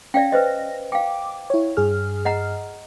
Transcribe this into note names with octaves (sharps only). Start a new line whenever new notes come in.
C#4 D5 F5 G5 A#6
B4 C5 D#5
F5 G5 D6
E4 C#5
G2 G#4 F6
D#5 F#5 A#5